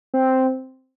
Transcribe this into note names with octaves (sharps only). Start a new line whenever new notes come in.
C4